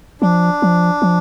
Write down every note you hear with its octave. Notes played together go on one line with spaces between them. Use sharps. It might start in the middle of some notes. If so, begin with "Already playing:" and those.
F3 D4
F3
F3